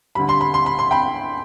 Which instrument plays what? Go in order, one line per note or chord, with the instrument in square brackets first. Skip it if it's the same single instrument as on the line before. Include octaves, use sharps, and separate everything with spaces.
[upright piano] D2 D3 G3 B5
C6
B5
C6
B5
C6
G5 B5